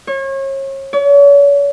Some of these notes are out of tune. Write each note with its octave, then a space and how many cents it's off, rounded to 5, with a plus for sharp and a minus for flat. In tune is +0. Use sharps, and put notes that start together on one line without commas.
C#5 -35
C#5 +40